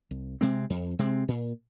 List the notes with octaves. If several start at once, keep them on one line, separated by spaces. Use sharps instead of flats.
C2
C3 G#3 C4
F2
C3 G#3 C4
A#2